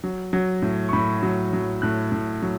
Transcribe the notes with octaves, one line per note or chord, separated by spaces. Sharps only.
F#3
F#3
A2
C#6
A2 B5
F#3
F#3
A2 F#6
A2
F#3